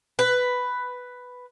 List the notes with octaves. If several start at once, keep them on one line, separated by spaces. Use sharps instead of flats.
B4